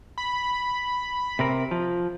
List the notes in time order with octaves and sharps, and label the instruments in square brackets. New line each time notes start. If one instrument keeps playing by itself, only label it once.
[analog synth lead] B5
[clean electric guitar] C3 C4 A#4
F3